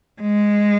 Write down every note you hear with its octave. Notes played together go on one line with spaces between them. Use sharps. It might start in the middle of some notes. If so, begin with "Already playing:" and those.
G#3